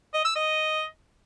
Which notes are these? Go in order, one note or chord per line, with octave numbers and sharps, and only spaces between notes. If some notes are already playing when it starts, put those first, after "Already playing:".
D#5
E6
D#5